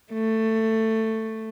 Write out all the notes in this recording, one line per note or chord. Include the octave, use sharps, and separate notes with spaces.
A3